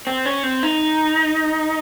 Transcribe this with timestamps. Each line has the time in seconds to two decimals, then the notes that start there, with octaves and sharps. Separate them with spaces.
0.07 C4
0.25 C#4
0.43 C4
0.63 D#4